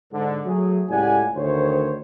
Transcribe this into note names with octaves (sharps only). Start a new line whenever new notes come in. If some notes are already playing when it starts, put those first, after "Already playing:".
G#2 D3
F#3 A3 G#4
C#2 A2 G4 D5 F#5 G#5
D2 D#3 C5 C#5